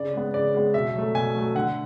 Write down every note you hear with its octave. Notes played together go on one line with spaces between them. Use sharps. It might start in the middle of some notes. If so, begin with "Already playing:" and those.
Already playing: C#3 D5
G#3 B3
C#3 D5
G#3 B3
B2 E5
F#3 A3
B2 G#5
F#3 A3
D3 F#5